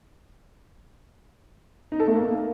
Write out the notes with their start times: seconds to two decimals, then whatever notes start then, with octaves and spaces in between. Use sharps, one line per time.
1.92 D#4
2.00 A4
2.07 A3
2.15 A#3